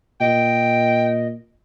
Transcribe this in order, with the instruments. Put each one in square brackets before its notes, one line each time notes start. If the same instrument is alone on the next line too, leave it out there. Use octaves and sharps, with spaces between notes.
[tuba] A#2 [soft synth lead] D#5 [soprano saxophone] G5